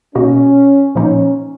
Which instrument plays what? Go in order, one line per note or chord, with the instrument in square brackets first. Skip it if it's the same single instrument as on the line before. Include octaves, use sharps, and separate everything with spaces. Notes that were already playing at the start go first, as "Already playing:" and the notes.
[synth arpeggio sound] B2 A#3 D#4 F#4 [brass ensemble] C#4
[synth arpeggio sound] A#2 F3 A#3 D#4 [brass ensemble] C#4